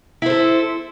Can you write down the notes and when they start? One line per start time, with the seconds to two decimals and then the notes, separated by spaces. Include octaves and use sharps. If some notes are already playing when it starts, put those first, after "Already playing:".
0.22 E4
0.26 C5
0.30 A4